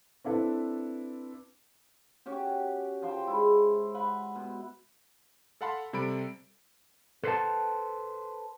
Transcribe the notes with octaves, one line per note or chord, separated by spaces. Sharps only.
C4 D4 E4 A4 B4
C#4 F#4 G4
F3 C5 G5 C#6
G#3 E4
F#5 G#5 B5
B2
A4 F5 F#5 A5 B5 C6
C3 G3 A4 B5 D7
A4 B4 C5 E5 F#5 A5